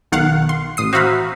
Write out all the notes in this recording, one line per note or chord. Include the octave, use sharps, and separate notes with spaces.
B1 D#3 F5 F#5
C6
A1 D#6 C7
F#4 C5 E5 F5 A#5 B5